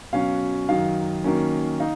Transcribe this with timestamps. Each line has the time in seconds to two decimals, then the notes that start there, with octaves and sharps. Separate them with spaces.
0.13 B2 F#3 C#4 F5
0.69 F#2 D#3 F#3 F5
1.24 D#3 F#3 A#3 C#4
1.80 D#4 F5